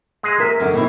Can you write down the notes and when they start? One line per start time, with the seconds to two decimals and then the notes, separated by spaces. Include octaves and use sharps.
0.23 G#3 G#4
0.40 A#4 E5
0.60 F#2 D3 D#3
0.74 B2 C4 E4